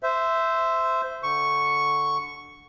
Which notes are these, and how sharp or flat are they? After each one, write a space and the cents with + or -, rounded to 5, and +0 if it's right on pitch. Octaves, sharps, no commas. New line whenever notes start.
C5 -15 E5 +5
D3 +0 C#6 +0